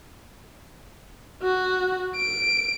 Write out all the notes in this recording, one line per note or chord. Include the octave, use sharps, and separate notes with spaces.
F#4
D7